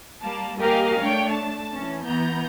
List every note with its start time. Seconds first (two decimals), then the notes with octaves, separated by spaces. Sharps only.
0.23 G3 A#3 A5
0.60 A#3 G4 A#4 D#5 F5 G#5
1.00 A3 D4 C#5 G5
1.31 A5
1.74 E3 C#4
2.06 E3 B3 A#5 G6